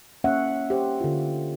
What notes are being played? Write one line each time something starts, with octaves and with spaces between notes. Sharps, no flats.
A#3 C#4 C#5 E5 F#5
G4 C5
D3 F4